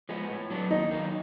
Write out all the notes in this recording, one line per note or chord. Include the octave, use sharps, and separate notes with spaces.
F3 G#3 B3
A2
F#3 B3 D4
D#2 D#4
D#3 F#3 A#3 D#4